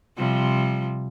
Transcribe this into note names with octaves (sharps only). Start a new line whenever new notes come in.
C3 F3 G3